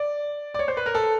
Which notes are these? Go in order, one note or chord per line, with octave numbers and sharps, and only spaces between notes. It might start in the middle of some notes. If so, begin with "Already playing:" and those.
Already playing: D5
D5
C#5
C5
B4
A#4
A4